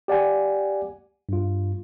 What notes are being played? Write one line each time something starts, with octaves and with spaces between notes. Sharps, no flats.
G4 D5 F#5 G#5
G2 F4